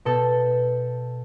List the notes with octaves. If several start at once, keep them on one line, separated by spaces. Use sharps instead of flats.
B2 A4 G6